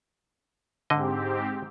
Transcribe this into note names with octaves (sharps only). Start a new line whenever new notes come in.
G#2 D3 C4 G4 D#5